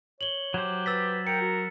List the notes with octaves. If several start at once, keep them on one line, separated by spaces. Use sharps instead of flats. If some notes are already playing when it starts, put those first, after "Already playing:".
C#5 F#7 G7
F#3 G4 C5
B4 E6 A6 B6
A#4 G5 C#7
F#4